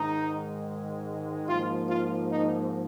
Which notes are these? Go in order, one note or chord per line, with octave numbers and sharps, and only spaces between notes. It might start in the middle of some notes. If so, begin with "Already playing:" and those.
Already playing: G#2 D#3 G#3 D#4
G#2 F3 A#3 F4
F4
D#4